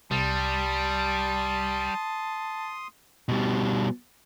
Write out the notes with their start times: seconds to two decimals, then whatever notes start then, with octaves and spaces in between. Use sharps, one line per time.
0.11 C2 G3 A5 C6 D#6
3.29 B2 G3